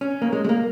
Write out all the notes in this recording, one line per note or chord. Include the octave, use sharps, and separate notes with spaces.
C#4
A#3
G#3
G#3
A#3